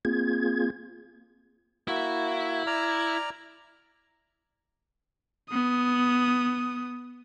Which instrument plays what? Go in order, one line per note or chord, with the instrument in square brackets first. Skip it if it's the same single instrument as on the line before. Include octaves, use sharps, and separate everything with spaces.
[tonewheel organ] A#3 C4 F4 G#4 G#6
[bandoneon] A#3 F#4 [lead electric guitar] E4
[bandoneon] D5 A#5 F6
[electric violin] B3 D#6